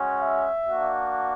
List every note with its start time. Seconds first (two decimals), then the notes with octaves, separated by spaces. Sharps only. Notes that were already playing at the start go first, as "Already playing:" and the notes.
Already playing: G#3 C#4 F#4
0.20 E5
0.67 A#3 D4 F#4